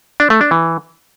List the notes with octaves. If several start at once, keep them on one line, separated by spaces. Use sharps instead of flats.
D4
A3
D4
E3